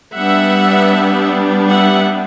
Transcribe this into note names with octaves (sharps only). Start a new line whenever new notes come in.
G3 B3 D4 E5 F#5
E5 F#5